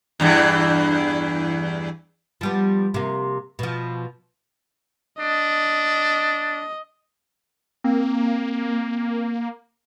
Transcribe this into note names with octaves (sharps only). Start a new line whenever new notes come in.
E2 G2 E3
F3 G3 B3
C3 A#3
B2 F3
D4 D#5
A#3 C4